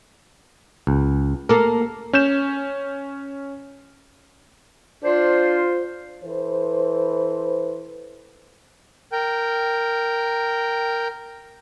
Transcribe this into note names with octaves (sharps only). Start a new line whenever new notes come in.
C#2
A#3 A4 A#4
C#4 G6 E7
D4 F4 C5
E3 A4 B4 C5
A#4 G5